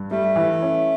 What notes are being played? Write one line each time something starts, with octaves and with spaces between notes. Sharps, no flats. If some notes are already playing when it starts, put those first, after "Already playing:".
Already playing: G2
G3 A3
E3
C#4